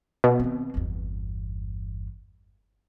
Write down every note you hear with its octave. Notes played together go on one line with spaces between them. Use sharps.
B2
D#3 C4
G1 E2